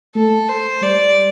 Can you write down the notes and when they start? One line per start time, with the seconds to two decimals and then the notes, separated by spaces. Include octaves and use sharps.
0.15 A3 A4
0.49 C5
0.82 G3 D5